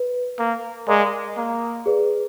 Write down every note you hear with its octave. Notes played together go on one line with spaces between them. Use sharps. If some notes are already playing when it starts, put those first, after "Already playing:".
Already playing: B4
A#3
G#3 A#4 D5 F5 A#5 D6
A#3
G#4 B4 D5